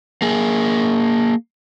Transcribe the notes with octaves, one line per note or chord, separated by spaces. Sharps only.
A#3 G#4